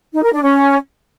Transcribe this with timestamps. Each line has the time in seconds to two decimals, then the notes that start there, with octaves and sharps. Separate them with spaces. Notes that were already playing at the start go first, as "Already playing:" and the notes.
0.14 D#4
0.23 A#4
0.33 D4
0.42 C#4